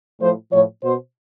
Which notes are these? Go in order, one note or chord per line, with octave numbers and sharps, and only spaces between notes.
A2 F3 C5
A2 F3 C#5
B2 C5